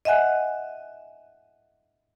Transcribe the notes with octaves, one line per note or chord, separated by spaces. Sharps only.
D#5 E5 F#5 G#5 F#6